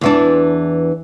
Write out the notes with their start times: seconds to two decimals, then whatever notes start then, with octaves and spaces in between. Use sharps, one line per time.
0.01 E2 E3 D4